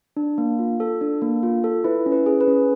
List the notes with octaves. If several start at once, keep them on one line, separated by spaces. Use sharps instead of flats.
D4
A#3
F4
A4
D4
A#3
F4
A4
E4 B4
C#4
B4
G#4
B4
C#4